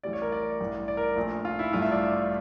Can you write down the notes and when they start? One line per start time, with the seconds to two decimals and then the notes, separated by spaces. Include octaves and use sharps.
0.03 A1 A2 G3 D5
0.13 C#5
0.22 A#4
0.32 D5
0.60 A1 G2 E3
0.88 D5
0.97 A#4
1.16 A#1 A#2 A3
1.45 F4
1.59 E4
1.72 A1 G2 E3 A3 F4
1.82 E5
1.92 D5